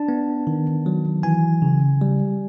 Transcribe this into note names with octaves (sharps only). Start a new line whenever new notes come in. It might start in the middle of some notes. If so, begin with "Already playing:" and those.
Already playing: D4 A5
B3
D#3
F#3
E3 G#5
C#3
G3